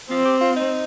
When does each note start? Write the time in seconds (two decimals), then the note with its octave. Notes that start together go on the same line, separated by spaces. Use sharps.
0.10 F3 C4
0.25 G4
0.41 F4
0.56 D#4